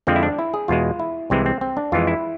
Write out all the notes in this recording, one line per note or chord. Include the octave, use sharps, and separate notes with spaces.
F2 D3 F3 G#3 C4
E4
D4
E4
G#4
E2 B2 G#3 F4
E4
C2 C3 E3 G#3 C4
C4
C4
D4
F2 E3 G#3 F4
E4